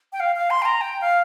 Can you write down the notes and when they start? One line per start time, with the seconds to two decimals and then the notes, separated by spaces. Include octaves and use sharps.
0.13 G5
0.20 F5
0.36 F5
0.50 C6
0.62 G5
0.65 A#5
0.81 G5
1.01 F5